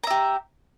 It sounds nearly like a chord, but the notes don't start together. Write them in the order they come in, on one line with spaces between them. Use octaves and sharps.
A#5 E5 G4